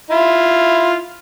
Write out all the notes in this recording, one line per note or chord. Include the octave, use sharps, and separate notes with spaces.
E4 F4